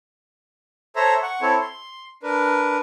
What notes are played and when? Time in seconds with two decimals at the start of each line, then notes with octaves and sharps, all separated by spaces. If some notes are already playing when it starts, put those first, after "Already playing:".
0.96 A4 C5 C#5 E5 A#5
1.22 F#5 C#6
1.42 C4 E4 A4 C#5
1.61 C6
2.23 D4 A#4 B4